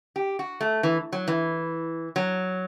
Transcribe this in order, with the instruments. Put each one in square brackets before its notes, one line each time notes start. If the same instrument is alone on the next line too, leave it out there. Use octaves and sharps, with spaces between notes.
[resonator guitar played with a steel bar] G4
F#4
A3
E3
F#3
E3
F#3